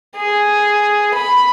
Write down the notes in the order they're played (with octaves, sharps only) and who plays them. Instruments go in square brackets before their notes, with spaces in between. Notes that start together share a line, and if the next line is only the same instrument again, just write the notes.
[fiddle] G#4
B5